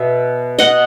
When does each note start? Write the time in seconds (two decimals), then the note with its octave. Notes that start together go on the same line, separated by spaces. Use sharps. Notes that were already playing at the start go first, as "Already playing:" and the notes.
Already playing: B2 E5
0.59 D#5 F#5